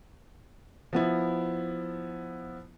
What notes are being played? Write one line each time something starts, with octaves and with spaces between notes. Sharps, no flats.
F3 B3 E4